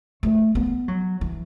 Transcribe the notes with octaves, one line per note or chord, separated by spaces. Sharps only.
A3
B3
F#3
E3